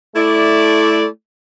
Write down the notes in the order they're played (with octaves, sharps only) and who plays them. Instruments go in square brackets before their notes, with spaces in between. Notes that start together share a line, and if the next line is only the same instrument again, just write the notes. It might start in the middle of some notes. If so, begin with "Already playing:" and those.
[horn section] A3 E4 D5